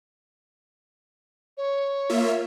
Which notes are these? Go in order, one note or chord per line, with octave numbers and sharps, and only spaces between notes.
C#5
A#3 F4 E5